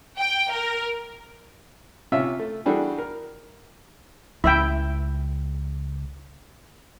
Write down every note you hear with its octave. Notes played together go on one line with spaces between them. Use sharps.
G5
A#4
C3 C#4 F4 E5 E6
A3
E3 G3 D4 F#4 G#4 A4
A#4
C#2 C#3 E4 E5 G5